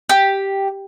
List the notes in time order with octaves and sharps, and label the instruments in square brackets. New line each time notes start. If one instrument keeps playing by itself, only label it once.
[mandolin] G4